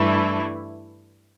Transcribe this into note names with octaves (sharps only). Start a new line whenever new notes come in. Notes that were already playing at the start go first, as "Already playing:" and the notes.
Already playing: G2 E3 A3 D4 E4